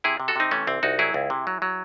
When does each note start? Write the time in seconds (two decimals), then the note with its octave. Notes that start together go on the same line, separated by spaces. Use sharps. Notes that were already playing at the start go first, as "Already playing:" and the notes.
0.04 C3 E4 G#4
0.20 C3
0.28 F#4 A4
0.36 C3 C4 D#4
0.51 E3 A3 C#4
0.67 C2 C4
0.83 C2 D#4 F#4
0.99 F#3 E4 G#4
1.14 C#2
1.30 C3
1.47 F#3
1.62 F#3